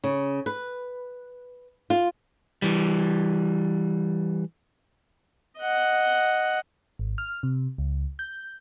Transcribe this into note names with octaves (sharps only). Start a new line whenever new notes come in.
C#3
B4
F4
E3 G3
D#5 F#5
G#1
F6
C3
C#2
G6